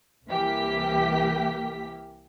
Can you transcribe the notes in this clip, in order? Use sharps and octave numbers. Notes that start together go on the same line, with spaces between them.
C2 E3 A#3 G4 B6